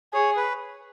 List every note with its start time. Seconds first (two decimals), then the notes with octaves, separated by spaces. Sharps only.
0.14 G#4 C#5
0.37 B4